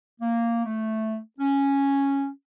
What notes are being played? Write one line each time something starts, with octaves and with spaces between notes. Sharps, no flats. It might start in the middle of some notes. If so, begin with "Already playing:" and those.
A#3
A3
C#4